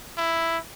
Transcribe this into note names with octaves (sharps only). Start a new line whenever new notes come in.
E4